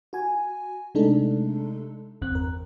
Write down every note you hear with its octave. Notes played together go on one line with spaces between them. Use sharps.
F#4 G#5
C3 G#3 A3 D4 D#4 A4
G1 E2 C4 F#6
A#4